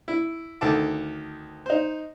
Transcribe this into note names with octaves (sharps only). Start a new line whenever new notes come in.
E4
D2 D#3 A4 A5 D6
D#4 C5